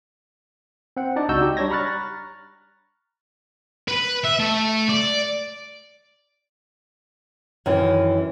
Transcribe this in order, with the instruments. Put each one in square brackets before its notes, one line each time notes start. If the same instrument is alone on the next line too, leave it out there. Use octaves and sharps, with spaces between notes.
[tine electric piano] C4 F#5
D4 D#4 D5
C#2 D#4 F#4 E6 G6
G4
G3 D4 C#5 G#6 A#6
A#5 B5 C#6 F6 F#6 A6
[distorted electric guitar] B4
E5
A3
D5
[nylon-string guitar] F#2 D#3 E3